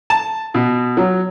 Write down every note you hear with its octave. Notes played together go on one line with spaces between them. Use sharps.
A5
B2
F#3